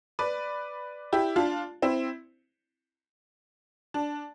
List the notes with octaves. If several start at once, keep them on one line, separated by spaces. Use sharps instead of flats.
B4 D5
E4 G4
D4 F4
C4 E4
D4